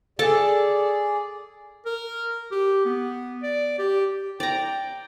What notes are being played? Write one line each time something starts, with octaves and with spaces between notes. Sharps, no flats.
G#4 A4 D5 A5
A#4
G4
B3
D5
G4
D5 G5 A#5